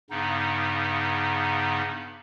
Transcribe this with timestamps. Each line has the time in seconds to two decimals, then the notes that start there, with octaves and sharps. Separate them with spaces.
0.10 G2 C#3 B3 D#4